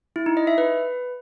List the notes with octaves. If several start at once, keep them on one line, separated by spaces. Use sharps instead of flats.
E4
D#4
D#5
E5
B4